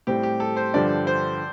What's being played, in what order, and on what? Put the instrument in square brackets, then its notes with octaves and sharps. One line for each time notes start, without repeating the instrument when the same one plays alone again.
[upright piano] A2 G3 C4 [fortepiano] G4
[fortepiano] G4
A4
C5
[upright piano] G2 D3 F3 [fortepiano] D5
[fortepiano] C5